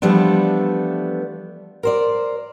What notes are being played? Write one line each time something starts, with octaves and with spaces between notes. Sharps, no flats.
E3 F3 G3 A3 B3 D4
A#4 C5 D5